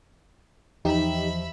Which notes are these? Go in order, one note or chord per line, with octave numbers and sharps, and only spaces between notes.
E2 F3 D#4 G4 E5 B5